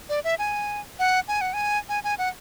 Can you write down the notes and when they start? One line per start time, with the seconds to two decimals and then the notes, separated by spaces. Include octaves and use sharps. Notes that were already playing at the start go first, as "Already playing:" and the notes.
0.09 D5
0.24 E5
0.39 G#5
0.99 F#5
1.28 G#5
1.41 F#5
1.54 G#5
1.89 G#5
2.04 G#5
2.18 F#5